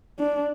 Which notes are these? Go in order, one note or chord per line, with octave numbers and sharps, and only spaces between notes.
D4